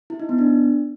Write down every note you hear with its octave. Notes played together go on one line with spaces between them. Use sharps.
E4
D#4
B3
D4